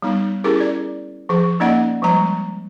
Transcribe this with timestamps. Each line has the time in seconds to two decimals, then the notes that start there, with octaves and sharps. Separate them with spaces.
0.02 G3 B3 D#4
0.44 C#4 E4 G4 G#4 A#4
0.60 D5
1.29 F3 G#4
1.60 A#3 C#4 D#4 D5 D#5 F#5
2.02 F3 G3 G#3 A#5